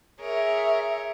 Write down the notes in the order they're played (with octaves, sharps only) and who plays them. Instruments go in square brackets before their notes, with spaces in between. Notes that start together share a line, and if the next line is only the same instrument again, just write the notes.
[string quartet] G#4 A#4 C#5 [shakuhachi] E5